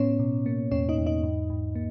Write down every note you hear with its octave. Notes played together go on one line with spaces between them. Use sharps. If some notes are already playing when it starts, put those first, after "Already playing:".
Already playing: A2 B3 C#4 C#5
B2
A#3
E2 C#4 C#5
D#4 D#5
E2
D#4 D#5
G#2
G#2
A#3